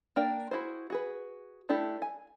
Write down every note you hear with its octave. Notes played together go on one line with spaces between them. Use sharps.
A#3 D4 A#4 D5 G5
E4 F#4 G#4 C5
F#4 G#4 B4
A3 D4 E4 G4 A4
G#5